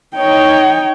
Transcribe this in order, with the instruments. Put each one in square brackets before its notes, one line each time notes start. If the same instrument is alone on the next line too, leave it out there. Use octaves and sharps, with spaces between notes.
[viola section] D#4 C#5 [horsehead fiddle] G5